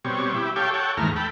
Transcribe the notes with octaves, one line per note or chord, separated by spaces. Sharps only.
B2 G3 C4 C#5
E4 G4
G4 A4 C#5 F5 G5
A4 C#5 F#5 G5
D#2 G#2 E3 A3 A#5 F6
A4 G5 B5